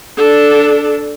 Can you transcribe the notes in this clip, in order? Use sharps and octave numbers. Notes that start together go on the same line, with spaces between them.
D4 A4